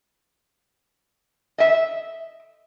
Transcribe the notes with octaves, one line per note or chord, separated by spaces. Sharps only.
D#5 E5